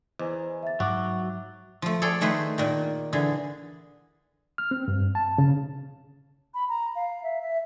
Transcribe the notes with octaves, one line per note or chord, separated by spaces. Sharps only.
E2 C5 D#5 G#5 A#5
E5 A6
G#2 F#3 F#4 D6
F3 A3
G#4 A4 C#5 D5 G5
D#3 A3 G#4 B4 C5
A#2 D#3
D3 E3 G#4
F6
C4
G2
A5
C#3
B5
A#5
F5
E5
E5